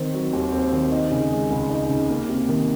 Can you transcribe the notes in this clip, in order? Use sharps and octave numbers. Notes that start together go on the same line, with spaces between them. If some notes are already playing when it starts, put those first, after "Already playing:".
Already playing: D#3 C4
F#3
D#2
C4
D#3
D#4
C#3
G#3
C#2
D#4
C#3
A#3
C3
D#3